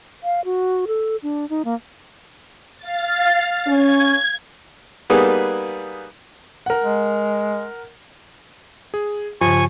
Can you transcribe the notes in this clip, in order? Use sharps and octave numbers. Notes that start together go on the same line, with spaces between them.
F5
F#4
A4
D4
D#4
A#3
F5 A6
C#4 G#6
G3 A#3 B3 D#4 G#4 B4
A#4 F#5
G#3
G#4
G2 C#3 F3 G#5 C#6